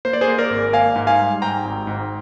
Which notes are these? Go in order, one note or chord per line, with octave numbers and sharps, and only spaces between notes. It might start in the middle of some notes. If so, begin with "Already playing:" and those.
A#3 C5
D5
G#4 C5
A#3
A#4 D5
G#1
A#3 F5 G#5
G#2
F5 G#5
G3
G#2 G5 A#5
G#1
G#2